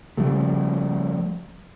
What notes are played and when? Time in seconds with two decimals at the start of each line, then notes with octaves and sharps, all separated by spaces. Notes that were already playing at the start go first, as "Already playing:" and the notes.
0.17 C#3 F3 G3 A3